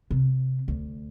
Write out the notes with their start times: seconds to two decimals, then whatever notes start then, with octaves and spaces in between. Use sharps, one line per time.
0.11 C3
0.68 D2